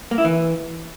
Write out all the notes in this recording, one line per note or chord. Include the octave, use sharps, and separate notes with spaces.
A#3
E4
E3